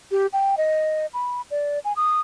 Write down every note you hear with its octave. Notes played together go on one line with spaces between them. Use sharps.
G4
G5
D#5
B5
D5
G#5
D#6